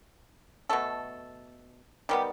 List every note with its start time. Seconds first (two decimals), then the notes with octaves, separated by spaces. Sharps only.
0.69 B2 A3 A4
2.09 D#3 G3 B3 G4